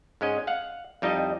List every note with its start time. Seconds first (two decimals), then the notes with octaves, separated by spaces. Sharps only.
0.21 G#2 G#3 C#4 D#5
0.47 F5 F#5
1.02 F2 G3 D#4 E4 D#5